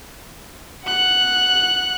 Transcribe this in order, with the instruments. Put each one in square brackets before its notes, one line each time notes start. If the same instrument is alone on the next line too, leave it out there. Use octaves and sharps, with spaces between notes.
[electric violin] F#5 F#6